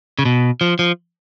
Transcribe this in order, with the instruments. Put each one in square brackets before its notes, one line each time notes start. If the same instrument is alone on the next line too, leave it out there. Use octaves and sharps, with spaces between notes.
[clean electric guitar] C#3
B2
F3
F3